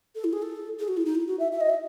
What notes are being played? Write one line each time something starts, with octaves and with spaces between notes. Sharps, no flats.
A4
E4
G#4
A4
G#4
F#4
E4
D#4
E4
F#4
E5
E5
D#5
E5